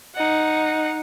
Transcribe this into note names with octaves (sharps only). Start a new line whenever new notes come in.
D#4 F#5